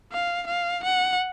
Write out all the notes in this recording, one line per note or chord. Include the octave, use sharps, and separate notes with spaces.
F5
F5
F#5